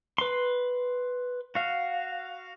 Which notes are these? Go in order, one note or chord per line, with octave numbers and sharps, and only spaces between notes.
B4 C6
F#4 F5